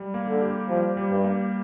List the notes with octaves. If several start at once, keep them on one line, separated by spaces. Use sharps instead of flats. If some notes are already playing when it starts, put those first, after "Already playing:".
Already playing: G3
A#3
D3
G4
F3 G3
G3
G2
A#3